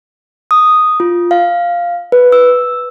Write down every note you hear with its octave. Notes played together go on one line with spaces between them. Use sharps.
D#6
F4
F5
B4
E6